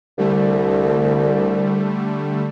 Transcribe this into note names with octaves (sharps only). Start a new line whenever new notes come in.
C2 D3 G3 A3